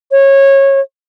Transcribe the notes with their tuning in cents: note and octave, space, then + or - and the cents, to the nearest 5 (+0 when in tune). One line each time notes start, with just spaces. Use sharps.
C#5 -20